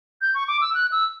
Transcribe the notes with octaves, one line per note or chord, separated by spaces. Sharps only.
G6
C#6
D6
E6
F#6
E6